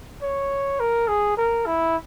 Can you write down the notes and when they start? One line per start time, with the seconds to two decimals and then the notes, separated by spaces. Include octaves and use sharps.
0.22 C#5
0.80 A#4
1.08 G#4
1.37 A#4
1.66 E4